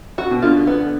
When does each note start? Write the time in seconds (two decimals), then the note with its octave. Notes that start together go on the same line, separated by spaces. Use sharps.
0.18 F#4
0.31 B2
0.42 D3 F4
0.67 B3